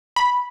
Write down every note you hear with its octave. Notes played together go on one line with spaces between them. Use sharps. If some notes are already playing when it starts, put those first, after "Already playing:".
B5